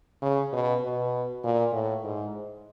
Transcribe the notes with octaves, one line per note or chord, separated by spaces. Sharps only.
C#3
B2
B2
A#2
A2
G#2